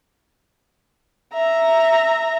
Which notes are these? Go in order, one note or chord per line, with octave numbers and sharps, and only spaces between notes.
E5 A#5